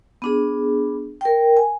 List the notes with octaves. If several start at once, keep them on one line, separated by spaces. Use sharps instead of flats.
B3 D4 G#4
A#4 G5
G#5